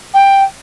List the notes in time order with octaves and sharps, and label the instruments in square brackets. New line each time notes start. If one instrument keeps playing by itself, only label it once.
[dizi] G5